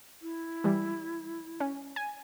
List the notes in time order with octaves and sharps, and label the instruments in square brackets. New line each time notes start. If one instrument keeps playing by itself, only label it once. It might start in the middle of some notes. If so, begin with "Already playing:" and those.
[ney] E4
[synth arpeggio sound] E3 G3
C#4
G#5